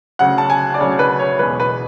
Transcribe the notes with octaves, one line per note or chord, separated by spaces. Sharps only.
D2 C#3 F#3 F#5
A5
G#5
D5
D2 C#3 F#3 C#5
B4
C#5
E2 B2 G#3 B4
B4